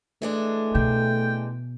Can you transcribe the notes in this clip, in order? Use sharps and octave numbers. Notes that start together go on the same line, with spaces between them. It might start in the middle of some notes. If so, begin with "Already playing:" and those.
E3 G#3 A3 D4
B2 G5